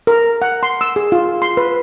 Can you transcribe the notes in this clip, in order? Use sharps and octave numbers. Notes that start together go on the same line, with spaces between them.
A#4
F#5
C6
E6
G#4
F4
C6
B4